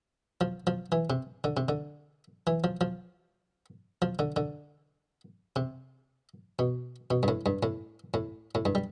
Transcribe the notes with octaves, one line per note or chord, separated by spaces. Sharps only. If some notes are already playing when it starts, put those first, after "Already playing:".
F3
F3
E3
C3
D3
C3
D3
E3
F3
F3
F3
D3
D3
C3
B2
B2
G2
A2
G2
A2
A2
A2
G2
G3